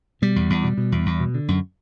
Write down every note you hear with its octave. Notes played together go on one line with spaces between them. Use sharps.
B2 G3
E2
E2
B2
B2
E2
E2
B2
D3
F#2